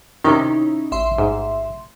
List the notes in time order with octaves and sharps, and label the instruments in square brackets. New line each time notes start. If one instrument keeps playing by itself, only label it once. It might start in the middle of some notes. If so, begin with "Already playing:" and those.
[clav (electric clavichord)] C3 D#3 [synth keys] C#4 D#4 E4
[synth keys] A1 E5 C6
[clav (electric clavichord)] G#2